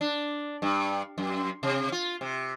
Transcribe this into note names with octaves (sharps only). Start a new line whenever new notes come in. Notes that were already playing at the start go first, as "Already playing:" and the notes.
D4
G2
F#2
C3
F4
C3